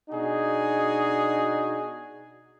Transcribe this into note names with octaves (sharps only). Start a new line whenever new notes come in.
B2 D4 D#4 F#4 G#4